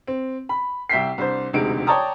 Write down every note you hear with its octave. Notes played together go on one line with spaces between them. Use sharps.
C4
B5
C2 E5 G5 B6 C7
C2 D4 C5
E1 D2 C3 G#3 D#4 D7
C#5 D5 G5 A5 A#5 D#6